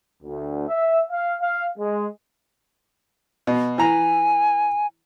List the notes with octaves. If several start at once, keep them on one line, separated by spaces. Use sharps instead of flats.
D2
E5
F5
F5
G#3
B2
E3 G#5 A#5